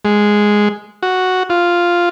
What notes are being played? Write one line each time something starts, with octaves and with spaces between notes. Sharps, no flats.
G#3
F#4
F4